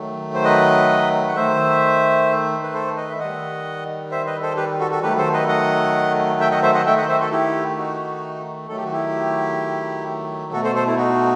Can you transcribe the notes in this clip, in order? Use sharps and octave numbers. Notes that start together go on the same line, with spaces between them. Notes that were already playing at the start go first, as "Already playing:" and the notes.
Already playing: D#3 F#3 A3
C5
B4 D#5
F#5
D#3 A3 C5 E5
B4
A4 C5
B4 D#5
E5
D#3 G3 D#5 F#5
C5 E5
B4 D#5
A4 C5
G4 B4
F#4 A4
F#4 A4
D#3 F#3 A3 G4 B4
A4 C5
B4 D#5
D#5 F#5
E5 G5
D#5 F#5
C5 E5
D#5 F#5
D#3 A3 E5 G5
D#5 F#5
C5 E5
F#4 A4
E4 G4
D#4 F#4
D#3 F#3 A3 A4
G4
F#4
E4 G4
B2 A3 F#4 A4
A4 C5
A4 C5
E4
D#4 F#4